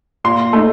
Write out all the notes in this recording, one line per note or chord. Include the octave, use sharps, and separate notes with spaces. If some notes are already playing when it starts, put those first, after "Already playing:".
A#2 C6
A3 D#4